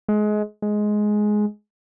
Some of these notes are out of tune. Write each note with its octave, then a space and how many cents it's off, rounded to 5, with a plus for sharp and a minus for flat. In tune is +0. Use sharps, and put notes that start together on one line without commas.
G#3 +25
G#3 +10